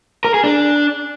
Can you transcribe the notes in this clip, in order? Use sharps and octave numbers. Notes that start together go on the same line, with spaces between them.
A#4
G#4
D4